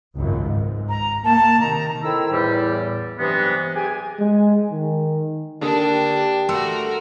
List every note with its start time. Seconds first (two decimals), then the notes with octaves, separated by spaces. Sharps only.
0.14 G#1 C#2 F#2
0.45 G#2
0.88 A#5
1.24 A#3 A5
1.60 C3 D#3 A#5
2.03 D#3 C4 E4 A4 E6
2.32 E2 A2 G3
3.18 G2 C3 E3 F#3 G#3 B3
3.75 G4 G#4 G#5
4.19 G#3
4.72 D#3
5.61 D3 A#3 D4 G4 D#6
6.49 A3 F#4 A#4 C6 E6 C#7